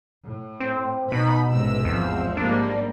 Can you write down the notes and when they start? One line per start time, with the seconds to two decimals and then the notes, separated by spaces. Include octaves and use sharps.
0.24 A2
0.60 C4
1.12 B2 D#4 B5
1.50 A1 G#2 C3 E6
1.85 E2 F3 C4
2.37 G#2 G3 A#3 D4